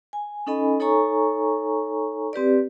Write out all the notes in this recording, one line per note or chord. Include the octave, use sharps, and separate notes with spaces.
G#5
C#4 D#4 A4 D#5 G#5 B5
D#4 A4 C#5 G#5 A#5 C#6
C4 G4 B4 D5